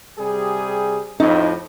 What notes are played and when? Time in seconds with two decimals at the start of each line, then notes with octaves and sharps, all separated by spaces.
0.18 C3 G3 G#4
1.20 F2 A2 D#4